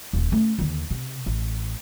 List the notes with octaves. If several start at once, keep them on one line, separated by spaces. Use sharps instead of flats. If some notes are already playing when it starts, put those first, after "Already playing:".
D#1 A#3
A3 C#4
D#2 D3
C3
A1